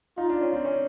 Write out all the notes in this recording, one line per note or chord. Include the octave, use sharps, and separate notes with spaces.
D#4 F4
D4
C#4
C4
C#4